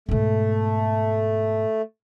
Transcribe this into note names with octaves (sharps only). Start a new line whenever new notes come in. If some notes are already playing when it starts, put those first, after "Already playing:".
G#2 B2 A3